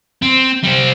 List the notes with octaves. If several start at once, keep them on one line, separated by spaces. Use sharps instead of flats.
C4
G3 C4